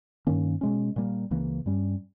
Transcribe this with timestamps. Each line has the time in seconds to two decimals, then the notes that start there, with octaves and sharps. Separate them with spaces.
0.27 G2 D#3 A#3 C#4
0.61 B2 G#3 C#4
0.96 A#2 G3 A#3
1.31 C#2 C#3 E3 A#3
1.66 G2 G3 C#4